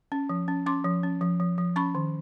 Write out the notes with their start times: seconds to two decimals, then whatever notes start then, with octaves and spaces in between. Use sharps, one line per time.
0.12 C#4
0.29 F3
0.48 C#4
0.66 C#4 C6 D6
0.84 F3
1.03 C#4
1.21 F3
1.40 F3
1.58 F3
1.76 C#4 B5 C#6
1.95 D#3